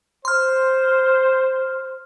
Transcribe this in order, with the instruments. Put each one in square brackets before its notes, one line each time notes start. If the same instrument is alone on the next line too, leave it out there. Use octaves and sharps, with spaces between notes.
[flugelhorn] C5 [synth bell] C6 F6